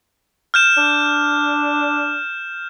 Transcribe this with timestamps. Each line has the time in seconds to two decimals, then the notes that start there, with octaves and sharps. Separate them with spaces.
0.54 F6 G6 E7
0.77 D4